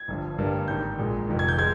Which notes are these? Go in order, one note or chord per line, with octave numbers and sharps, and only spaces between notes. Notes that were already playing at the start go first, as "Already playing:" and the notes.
Already playing: G#6
G1 G2 F3
G1 G2 G3 A#3
G#1 G#2 G3 G6
A#1 A#2 G#3
F1 F2 D#3
G#6
G6
F3 G#3 G#6